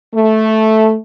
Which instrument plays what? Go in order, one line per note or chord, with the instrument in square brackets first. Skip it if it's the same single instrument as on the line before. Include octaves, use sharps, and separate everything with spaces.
[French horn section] A3